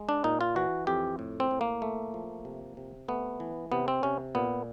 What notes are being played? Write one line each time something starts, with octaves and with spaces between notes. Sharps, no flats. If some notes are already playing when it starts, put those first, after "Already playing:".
Already playing: G#3
D4
A#2 D#4
F4
E3 F#4
F2 G4
A2
C4
A2
A#3
A3
F3
C3
C3
A3 B3
E3
C3 B3
C4
C3 C#4
A#2 B3